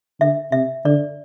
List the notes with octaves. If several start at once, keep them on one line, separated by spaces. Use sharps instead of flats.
D3 E5
C3 E5
D3 D5